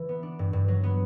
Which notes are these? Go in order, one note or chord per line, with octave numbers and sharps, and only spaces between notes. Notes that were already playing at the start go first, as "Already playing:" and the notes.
Already playing: E3
B3
D4
G2
G2
F#3
B3